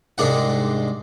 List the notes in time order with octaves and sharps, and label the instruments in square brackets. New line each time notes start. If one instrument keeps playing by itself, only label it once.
[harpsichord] C2 G#2 D4 F#5